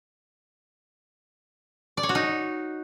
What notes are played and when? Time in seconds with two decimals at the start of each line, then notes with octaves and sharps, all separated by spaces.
1.97 D5
2.03 C#5
2.09 F#4
2.15 D#4